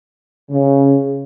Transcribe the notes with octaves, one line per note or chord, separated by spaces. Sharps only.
C#3